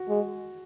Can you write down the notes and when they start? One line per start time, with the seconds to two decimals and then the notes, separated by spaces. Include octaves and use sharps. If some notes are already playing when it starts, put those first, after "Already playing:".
Already playing: F#4
0.09 G#3